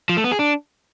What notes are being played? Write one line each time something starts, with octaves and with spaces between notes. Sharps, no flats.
F3
A3
B3
G#4
D4